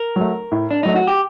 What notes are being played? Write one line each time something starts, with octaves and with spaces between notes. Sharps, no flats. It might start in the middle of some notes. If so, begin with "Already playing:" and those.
Already playing: A#4
F#3 A3
A2
D4
F#3 A3 D#4
F#4
G4